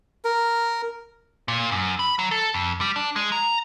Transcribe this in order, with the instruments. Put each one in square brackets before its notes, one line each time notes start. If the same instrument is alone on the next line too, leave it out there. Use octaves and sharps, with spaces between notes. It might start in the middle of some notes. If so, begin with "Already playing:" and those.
[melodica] A#4
[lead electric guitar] A#2
F#2
B5
F#3
A4
F2
G3
D4
G#3
A#5